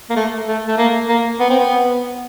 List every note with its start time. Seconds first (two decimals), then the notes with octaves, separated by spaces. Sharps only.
0.10 A#3
0.16 A3
0.48 A3
0.67 A3
0.78 A#3
1.09 A#3
1.40 B3
1.50 C4
1.60 B3